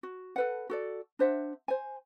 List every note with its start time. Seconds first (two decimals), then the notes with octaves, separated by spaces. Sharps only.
0.03 F#4
0.36 A4 B4 F#5
0.70 F#4 A4 D5
1.19 D4 C5 E5 F#5
1.68 C5 G#5